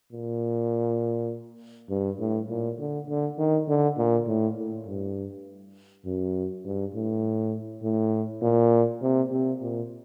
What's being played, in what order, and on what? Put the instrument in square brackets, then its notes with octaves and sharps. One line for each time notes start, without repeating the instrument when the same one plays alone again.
[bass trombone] A#2
G2
A2
A#2
D3
D3
D#3
D3
A#2
A2
A2
G2
F#2
G2
A2
A2
A#2
C3
C3
A#2